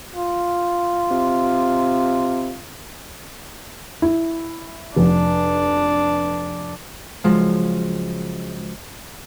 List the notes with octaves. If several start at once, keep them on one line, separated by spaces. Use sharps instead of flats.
F4
C3
E4
F1 D4
C#2 F3 F#3 G#3